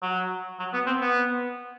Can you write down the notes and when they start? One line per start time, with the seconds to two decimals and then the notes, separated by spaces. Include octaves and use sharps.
0.02 F#3
0.59 F#3
0.73 B3
0.87 C4
1.01 B3